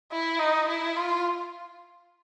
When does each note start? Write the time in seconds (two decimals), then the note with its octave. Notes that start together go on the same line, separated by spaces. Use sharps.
0.12 E4
0.40 D#4
0.68 E4
0.96 F4